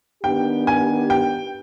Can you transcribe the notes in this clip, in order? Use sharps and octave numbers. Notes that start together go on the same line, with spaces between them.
D#3 B3 D4 G4 G5
G#5
G5